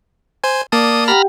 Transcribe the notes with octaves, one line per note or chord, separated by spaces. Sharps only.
C5 G#5
A#3 D5 A5 D6 D#6
G4 F#5 G5 A#5 B5 F6